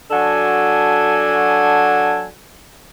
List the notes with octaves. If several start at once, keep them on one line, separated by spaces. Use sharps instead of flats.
F#3 D4 F#4 A4 G#5